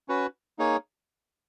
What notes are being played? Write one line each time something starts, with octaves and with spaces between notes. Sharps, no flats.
C#4 F#4 B4
A#3 D#4 G#4 C#5